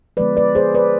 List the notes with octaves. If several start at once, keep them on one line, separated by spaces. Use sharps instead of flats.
D3 F3 G#3 B3 B4 D5
B4 D5
G#4 C5
B4 D5